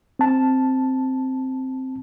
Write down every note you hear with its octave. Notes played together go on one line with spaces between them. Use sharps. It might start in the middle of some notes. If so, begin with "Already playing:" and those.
C4 A5